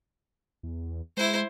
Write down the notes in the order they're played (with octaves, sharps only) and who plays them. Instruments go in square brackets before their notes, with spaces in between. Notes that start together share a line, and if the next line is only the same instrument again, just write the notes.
[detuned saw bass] E2
[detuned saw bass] G#3 [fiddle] E4 C5